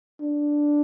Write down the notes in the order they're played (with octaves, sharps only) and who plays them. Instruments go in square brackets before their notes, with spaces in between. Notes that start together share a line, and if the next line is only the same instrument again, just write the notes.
[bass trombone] D4